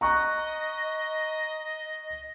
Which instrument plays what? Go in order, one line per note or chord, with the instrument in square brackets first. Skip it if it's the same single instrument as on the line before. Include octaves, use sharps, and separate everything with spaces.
[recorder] D#5 [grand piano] A#5 C#6 F#6